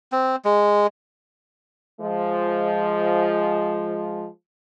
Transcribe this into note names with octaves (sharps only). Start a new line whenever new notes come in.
C4
G#3
F3 G#3